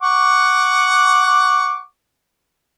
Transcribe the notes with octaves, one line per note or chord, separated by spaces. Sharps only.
F#5 C#6 D6